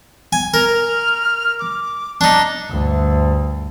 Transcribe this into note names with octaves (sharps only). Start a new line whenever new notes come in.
G#5
A#4 F6
D6
D4 D#4 D6
D2 G2